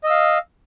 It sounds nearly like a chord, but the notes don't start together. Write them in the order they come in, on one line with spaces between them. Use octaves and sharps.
D#5 E6 F5